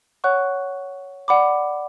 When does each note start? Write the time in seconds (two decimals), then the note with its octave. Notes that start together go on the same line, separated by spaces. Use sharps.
0.24 C#5 F#5 C#6 F#6
1.28 D5 F#5 B5 D6